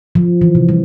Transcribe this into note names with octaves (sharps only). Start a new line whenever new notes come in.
F3
E3
C3
G3